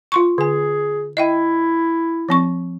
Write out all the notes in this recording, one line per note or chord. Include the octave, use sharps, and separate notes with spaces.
F4 C6 C#6
D3 G#4 G#5
E4 D#5 E5 G5
F3 C4 C#6